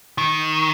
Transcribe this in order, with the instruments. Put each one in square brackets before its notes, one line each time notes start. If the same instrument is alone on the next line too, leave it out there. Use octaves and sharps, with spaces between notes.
[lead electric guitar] D#3